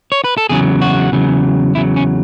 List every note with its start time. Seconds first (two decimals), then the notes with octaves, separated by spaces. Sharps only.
0.12 C#5
0.24 B4
0.37 A4
0.49 E2 C#3 F#3 G#4
0.81 F#4
1.12 E2 C#3 F#3
1.75 E2 C#3 F#3 E4
1.96 C#4